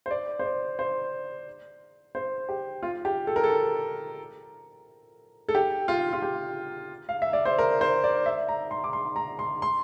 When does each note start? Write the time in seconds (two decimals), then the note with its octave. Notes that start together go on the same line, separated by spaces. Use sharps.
0.06 C5
0.11 D5
0.39 C5
0.45 D5
0.79 C5
2.15 C5
2.49 G4
2.83 F4
3.05 G4
3.27 A4
3.36 A#4
3.44 A4
5.49 A4
5.55 G4
5.88 F4
6.13 F4
6.22 G4
7.09 F5
7.22 E5
7.33 D5
7.45 C5
7.59 A#4
7.81 C5
8.04 D5
8.26 E5
8.49 A#5
8.71 C6
8.84 D6
8.93 C6
9.16 A#5
9.39 C6
9.62 C6